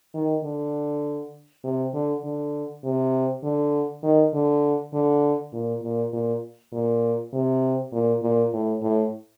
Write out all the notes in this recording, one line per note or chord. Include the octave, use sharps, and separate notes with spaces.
D#3
D3
C3
D3
D3
C3
D3
D#3
D3
D3
A#2
A#2
A#2
A#2
C3
A#2
A#2
A2
A2